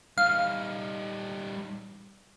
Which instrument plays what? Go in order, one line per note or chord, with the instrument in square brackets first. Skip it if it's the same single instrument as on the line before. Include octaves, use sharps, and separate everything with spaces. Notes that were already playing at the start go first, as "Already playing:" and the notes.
[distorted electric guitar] G3 D#4 [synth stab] F5